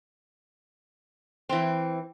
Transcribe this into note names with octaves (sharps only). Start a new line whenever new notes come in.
E3 C4